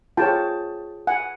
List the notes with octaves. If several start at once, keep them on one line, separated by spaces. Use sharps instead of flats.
F4 G#4 C#5 G5 A5
F#5 G#5